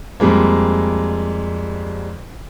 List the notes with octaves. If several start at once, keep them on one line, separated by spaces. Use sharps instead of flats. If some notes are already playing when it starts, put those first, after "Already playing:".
F2 G3 G#3 A#3